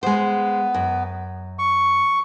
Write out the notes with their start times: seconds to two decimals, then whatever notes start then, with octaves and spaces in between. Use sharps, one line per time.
0.03 G#3 B3 C5
0.74 F#2
1.59 C#6